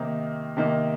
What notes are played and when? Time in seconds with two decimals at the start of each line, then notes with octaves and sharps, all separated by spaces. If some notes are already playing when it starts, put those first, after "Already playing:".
Already playing: C3 D#3 A#3 D#4
0.57 C3 D#3 A#3 D#4